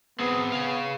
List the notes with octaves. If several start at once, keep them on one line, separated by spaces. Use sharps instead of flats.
B3 C4 G#4
G#4 F5